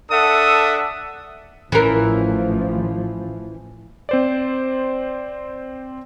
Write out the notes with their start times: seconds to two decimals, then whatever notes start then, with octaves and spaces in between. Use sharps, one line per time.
0.11 D4 A4 E5 F#5 D#6
1.72 A1 E3 F3 C#4 A#4
4.09 C4 C5 D5